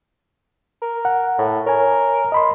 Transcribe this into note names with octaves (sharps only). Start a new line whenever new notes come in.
A#4
F#5
A2
A#4 C#5 G#5
D#5 B5 C6